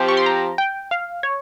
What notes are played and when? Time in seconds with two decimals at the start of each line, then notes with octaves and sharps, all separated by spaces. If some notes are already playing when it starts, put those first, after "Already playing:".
Already playing: F3 C4 G4
0.08 C#6
0.17 C6
0.26 A#5
0.58 G5
0.91 F5
1.23 C#5